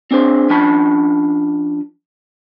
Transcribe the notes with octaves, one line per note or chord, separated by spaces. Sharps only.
C4 D4 G#4 C5
F3 C#4 D4 A5 B5